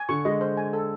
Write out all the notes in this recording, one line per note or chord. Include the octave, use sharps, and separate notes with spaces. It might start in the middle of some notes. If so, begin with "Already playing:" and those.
Already playing: G#5
D3 C#6
G#3 D#5
C5
G#5
A4